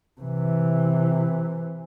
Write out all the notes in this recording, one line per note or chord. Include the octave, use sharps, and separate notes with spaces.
C3 E3